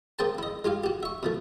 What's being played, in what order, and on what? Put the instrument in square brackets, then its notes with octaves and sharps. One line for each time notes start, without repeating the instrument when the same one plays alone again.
[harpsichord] A#3 G#4 C5 G5 A5
E4 D#5
G#3 F4 G4 F5
F#4 G4
E5 C#6
B2 F3 A3